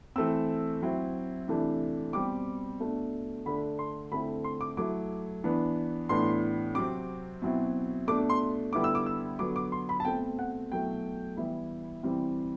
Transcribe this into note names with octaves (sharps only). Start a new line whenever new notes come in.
E3 A3 C4 E6
F#3 C4 E4
C3 E3 A3 D4
B2 G3 C4 D6
B2 A3 D4
D3 A3 D4 B5
C6
D3 A3 C4 E4 B5
C6
D6
F#3 A3 E4 D6
E3 B3 D4
A2 E3 B3 D4 C6
C3 F#3 C4 D6
B2 F#3 C4 E4
B2 A3 D4 D6
C6
D3 G3 B3 E4 D6
E6
D6
E6
D3 F#3 B3 D6
D6
C6
B5
A5
B2 A3 C4 G5
F#5
B2 F#3 A3 E4 G5
E3 G3 B3 E4
C3 E3 G3 C4